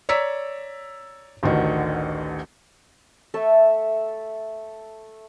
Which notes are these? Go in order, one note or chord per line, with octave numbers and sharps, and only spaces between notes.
C#5 D5 A#5 E6 B6
A1 D2 D3 D#3
A3 A4 E5 A5